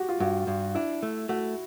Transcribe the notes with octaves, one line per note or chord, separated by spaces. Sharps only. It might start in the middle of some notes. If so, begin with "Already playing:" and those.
Already playing: F#4 G4
F4
G2 F#4
G2
D4 E4
A3
A3 F#4